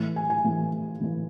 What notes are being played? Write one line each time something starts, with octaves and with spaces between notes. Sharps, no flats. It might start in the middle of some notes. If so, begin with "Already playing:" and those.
Already playing: A2 E3
G#5
G#5
A2 E3
A2 E3